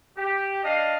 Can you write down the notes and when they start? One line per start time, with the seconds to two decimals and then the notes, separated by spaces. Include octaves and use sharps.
0.17 G4
0.64 D4 D#5 F5